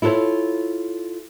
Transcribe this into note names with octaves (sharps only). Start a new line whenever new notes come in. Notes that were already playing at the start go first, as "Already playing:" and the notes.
E4 F4 A4 B4 C#5